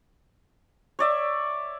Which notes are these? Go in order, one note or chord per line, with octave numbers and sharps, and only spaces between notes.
C#5 D5 E5